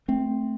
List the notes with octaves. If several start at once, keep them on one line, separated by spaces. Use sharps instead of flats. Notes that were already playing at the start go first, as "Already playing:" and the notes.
A3 C4